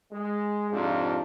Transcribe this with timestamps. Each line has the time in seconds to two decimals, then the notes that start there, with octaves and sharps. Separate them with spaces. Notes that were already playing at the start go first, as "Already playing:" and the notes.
0.12 G#3
0.71 F2 G#2 C3 D4 F4